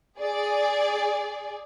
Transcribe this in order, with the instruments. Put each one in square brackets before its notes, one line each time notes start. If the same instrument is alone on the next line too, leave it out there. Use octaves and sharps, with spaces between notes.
[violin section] G#4 D5